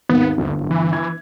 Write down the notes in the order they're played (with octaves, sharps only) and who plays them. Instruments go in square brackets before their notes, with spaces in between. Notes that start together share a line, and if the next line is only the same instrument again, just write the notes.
[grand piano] G#1 D#2 [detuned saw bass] B3
[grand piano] G1 [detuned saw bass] D2
[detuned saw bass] D1
E3
[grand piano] G#6